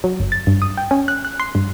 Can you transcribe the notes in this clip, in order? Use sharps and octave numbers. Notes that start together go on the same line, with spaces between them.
F#3
G1
A6
G2
D#6
G5
C#4
F#6
F#6
C6
G2